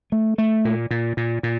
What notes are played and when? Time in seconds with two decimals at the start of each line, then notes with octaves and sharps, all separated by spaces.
0.12 A3
0.38 A3
0.65 A#2
0.91 A#2
1.17 A#2
1.43 A#2